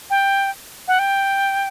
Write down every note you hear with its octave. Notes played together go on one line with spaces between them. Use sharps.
G5
F#5
G5